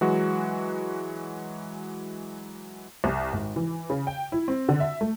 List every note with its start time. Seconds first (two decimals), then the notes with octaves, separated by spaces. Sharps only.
0.01 E3 F#3 G#3 F#4
3.04 C2
3.33 G#1
3.56 E3
3.90 C#3
4.07 G5
4.32 E4
4.48 C4
4.69 D3
4.80 E5
5.01 A3